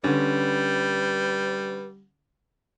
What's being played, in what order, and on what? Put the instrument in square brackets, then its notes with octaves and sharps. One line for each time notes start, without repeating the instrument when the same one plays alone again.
[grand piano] D3 C#4 [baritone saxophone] G3 [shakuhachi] B4